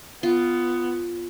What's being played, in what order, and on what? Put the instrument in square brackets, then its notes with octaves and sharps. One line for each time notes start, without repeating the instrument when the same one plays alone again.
[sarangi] B3 [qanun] F4